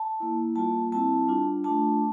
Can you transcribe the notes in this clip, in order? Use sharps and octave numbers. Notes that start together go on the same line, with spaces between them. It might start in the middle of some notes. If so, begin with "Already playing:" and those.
Already playing: A5
A#3 E4
G3 A#3 F4 A5
G3 C4 E4 A5
G3 D4 F4
A3 D4 F4 A5